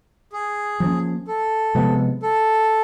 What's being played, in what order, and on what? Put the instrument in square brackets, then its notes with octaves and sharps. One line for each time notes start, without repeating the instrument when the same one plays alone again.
[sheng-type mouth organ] G#4
[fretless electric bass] F3 A#3 C#4
[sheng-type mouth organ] A4
[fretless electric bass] C3 F3 G#3 B3
[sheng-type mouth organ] A4